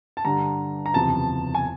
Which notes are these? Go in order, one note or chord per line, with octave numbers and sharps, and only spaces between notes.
A5
G2 D3 G3 A#5
A#5
F#1 E2 C3 F3 A5
G#5